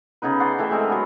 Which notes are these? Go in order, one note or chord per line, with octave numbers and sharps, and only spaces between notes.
C#3 B3 D#4 B4
D5 F#5 C6
E3 A3 E5 G5
G#3 C4 A#4 D#5
F#3 B3 D4